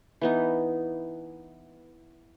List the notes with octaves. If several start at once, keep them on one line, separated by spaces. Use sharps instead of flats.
E3 B3 D#4